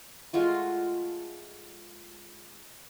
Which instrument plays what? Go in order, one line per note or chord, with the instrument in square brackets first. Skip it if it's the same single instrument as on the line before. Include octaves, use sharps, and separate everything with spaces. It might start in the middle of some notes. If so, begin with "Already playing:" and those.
[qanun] G#3 A3 F4 F#4